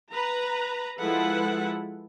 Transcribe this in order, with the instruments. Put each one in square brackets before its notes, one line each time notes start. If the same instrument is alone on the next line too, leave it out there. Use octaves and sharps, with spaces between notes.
[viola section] B4 A#5
F3 G#3 E4 A4 B4 F#5